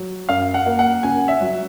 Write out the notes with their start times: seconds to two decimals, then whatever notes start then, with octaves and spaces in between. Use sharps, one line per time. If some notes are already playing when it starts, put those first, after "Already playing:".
Already playing: F#3
0.29 F#2 F5
0.54 F#5
0.66 A#3
0.79 F#5
1.03 C#3 G#5
1.28 E5
1.41 F#3